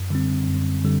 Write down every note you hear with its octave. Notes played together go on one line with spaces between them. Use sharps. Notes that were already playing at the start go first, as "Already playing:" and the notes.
Already playing: F#2
D3 G3 C4
F#2
D3 G3